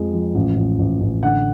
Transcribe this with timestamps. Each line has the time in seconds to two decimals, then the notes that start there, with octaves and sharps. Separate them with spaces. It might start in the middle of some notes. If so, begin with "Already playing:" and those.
Already playing: F2 F3 G#3
0.13 F3
0.35 A1
0.57 A1
0.79 A1
1.01 A1
1.22 D3 F#5